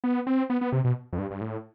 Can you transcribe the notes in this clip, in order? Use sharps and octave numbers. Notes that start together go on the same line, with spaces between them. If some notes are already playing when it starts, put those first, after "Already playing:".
B3
C4
B3
B3
C3
B2
F2
G2
G2
A2